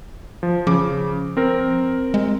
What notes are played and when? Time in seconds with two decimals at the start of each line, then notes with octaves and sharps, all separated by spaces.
0.43 F3
0.67 C#3 F3 D6
1.37 C4 A#4
2.14 G#3